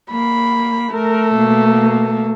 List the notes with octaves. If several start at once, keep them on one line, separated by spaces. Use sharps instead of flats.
A#3 B5
A3 A#4
B2 A#3